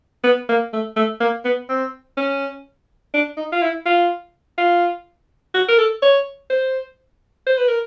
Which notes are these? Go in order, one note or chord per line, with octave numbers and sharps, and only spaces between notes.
B3
A#3
A3
A3
A#3
B3
C4
C#4
D4
D#4
F4
E4
F4
F4
F#4
A#4
A4
C#5
C5
C5
B4
A#4